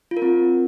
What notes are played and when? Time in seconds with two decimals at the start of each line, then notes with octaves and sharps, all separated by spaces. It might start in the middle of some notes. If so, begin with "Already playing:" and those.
0.11 F4
0.17 A#4
0.22 C4